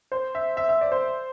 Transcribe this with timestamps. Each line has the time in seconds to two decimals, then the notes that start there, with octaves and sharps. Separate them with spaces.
0.12 C5
0.35 E5
0.57 E5
0.69 E5
0.81 D5
0.92 C5